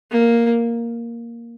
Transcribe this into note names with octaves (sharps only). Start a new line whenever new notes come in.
A#3